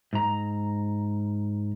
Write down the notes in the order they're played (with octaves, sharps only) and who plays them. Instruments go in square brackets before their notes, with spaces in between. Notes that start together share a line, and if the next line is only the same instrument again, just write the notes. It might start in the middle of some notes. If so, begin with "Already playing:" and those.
[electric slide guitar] G#2 A#5